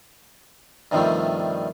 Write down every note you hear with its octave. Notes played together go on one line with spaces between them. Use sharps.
G2 C3 D#3 F3 G3 A3